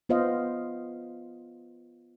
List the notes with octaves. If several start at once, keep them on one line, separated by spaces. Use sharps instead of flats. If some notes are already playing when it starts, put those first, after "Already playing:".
B3 F4 C5 D#5 F5